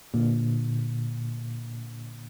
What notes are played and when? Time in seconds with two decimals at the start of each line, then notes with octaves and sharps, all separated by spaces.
0.14 A#2 D3